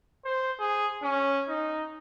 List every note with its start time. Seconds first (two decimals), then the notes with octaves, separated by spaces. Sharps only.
0.25 C5
0.59 G#4
1.03 C#4
1.49 D#4